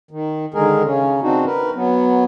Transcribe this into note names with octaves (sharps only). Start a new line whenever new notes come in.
D#3
D3 D#3 G#3 G#4 A#4
C#3 C#4
C4 D4 D#4 F#4
A#4 B4
F#3 B3